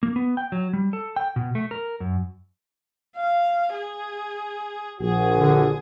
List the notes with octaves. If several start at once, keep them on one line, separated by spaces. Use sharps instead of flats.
A#3
B3
G5
F#3
G3
A4
G5
B2
A3
A#4
F#2
F5
G#4
A#1 F#4 G#4
D3